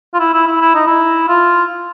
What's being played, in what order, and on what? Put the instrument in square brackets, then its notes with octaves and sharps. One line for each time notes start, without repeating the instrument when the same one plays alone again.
[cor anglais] F4
E4
E4
E4
E4
D#4
E4
F4